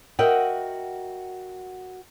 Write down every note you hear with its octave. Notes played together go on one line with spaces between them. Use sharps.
F#4 A#4 D#5 E5 F#5 G5